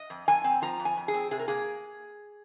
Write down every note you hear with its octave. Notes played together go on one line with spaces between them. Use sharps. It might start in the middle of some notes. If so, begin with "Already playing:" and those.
Already playing: D#5
F2
F2 G#5
C4
F3 A#5
F2
G#5
F2
G#4
C4
C3 G#4
A#4
A#3 G#4